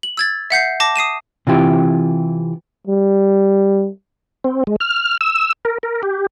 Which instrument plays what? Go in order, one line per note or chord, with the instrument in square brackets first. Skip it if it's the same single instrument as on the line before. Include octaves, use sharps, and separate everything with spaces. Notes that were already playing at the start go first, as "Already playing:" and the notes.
[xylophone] F#7
E6 G#6 A6
E5 F#5 G6 C7
A5 D6 A#6
D#6 C7 D#7 E7
[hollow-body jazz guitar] C3 E3 F4 G4
[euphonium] G3
[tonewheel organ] C4
G#3
F6
E6
A#4
A#4
G4